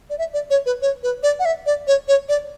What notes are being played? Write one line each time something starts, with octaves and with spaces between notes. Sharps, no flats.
D5
E5
D5
C#5
B4
C#5
B4
D5
F#5
E5
D5
C#5
C#5
D5